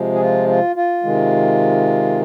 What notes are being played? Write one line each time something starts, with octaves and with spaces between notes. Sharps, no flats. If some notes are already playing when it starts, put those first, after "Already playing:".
Already playing: C3 F3 G#3
G#4
F4
F4
F4
C3 D#3 G#3